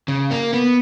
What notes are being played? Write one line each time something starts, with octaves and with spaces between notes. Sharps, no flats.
C#3
A#3
B3